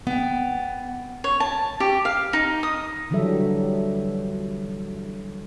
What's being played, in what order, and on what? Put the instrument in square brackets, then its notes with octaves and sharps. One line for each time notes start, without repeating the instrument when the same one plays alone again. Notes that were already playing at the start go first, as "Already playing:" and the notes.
[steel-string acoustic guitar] B3 G5
[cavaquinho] C#5
A5
G4
F5
D#4
D#6
[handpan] D3 E3 F#3 G3 A4 E5